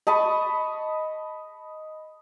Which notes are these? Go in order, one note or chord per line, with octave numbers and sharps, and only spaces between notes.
D#5 A5 B5 C#6